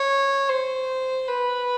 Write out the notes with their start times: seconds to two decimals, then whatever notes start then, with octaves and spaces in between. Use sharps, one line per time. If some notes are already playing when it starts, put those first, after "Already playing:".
Already playing: C#5
0.49 C5
1.28 B4